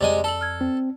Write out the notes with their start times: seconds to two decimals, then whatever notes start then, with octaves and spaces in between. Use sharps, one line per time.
0.01 F2 C3 G#3 D5 G#5
0.24 A4 A5 F#7
0.41 F6 G#6
0.61 C4